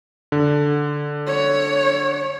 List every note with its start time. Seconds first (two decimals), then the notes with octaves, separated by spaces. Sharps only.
0.32 D3
1.28 C#5